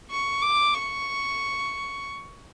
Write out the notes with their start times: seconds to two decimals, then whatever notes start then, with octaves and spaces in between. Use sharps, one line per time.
0.11 C#6
0.42 D6
0.73 C#6